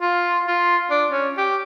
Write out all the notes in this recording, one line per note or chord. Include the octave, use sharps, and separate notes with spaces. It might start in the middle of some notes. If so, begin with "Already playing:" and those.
F4
F4
D4
C#4
G4